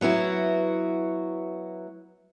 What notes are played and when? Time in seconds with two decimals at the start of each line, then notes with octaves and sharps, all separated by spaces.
0.01 F#3 B3 E4 F#4